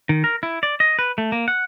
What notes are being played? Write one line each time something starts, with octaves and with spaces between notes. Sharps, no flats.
D#3
A#4
E4
D5
D#5
B4
A3
A#3
F#5